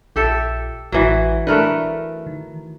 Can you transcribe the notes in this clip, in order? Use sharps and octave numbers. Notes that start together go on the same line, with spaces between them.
A#1 G4 A4 E5
A1 E3 F#3
A3 D4 A#4 B4
D#3